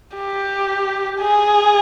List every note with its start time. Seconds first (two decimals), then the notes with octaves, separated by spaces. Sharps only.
0.17 G4
1.20 G#4